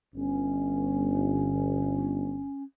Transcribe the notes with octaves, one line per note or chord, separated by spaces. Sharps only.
G1 C#4